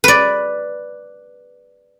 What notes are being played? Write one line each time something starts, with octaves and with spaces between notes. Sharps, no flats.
B4 D5